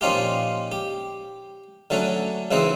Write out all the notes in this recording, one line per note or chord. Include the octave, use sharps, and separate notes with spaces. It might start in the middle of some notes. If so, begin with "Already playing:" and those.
A#2 F3 C#4 D#4 F4 G4
G4
D3 F#3 A3 C#4
C#3 E3 C4 D#4 E4